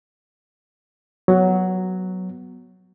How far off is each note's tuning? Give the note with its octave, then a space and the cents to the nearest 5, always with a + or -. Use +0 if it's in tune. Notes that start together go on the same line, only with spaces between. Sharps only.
F#3 +5 B3 +0